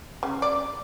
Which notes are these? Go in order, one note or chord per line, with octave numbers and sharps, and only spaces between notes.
C#3
D5